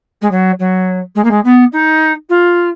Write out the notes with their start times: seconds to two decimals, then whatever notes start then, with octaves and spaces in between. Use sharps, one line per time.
0.21 G#3
0.31 F#3
0.59 F#3
1.15 G#3
1.24 A#3
1.31 G#3
1.44 B3
1.72 D#4
2.29 F4